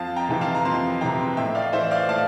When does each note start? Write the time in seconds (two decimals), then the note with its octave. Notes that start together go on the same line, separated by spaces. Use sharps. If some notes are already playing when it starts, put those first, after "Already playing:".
Already playing: F2 F5 A5
0.16 G5 A#5
0.29 C3 E3
0.41 F5 A5
0.55 A#5
0.65 F2 A5 C6
1.01 C3 E3 G5 A#5
1.37 A2 E5 G5
1.55 D5 F5
1.73 E3 C5 E5
1.91 D5 F5
2.09 A2 F5 A5